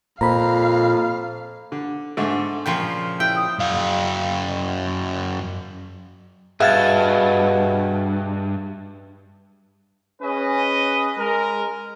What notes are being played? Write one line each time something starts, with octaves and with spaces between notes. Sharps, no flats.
F2 A#2 F5 A#5 B5
D3
G#2 D3 A3
A#2 C#3 F3 G5
E4 G5 G6
D#6
F#2 F5
G2 B2 G#4 E5 F5 G#6 A6
C#4 G#4 B4 D#5
G#3 A#4